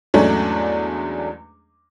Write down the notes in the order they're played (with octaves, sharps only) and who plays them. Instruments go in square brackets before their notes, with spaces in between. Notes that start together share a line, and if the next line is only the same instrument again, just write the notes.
[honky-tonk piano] E2 G#2 F#3 A3 C#4 D4